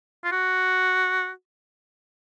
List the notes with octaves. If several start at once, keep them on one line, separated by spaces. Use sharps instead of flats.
F4
F#4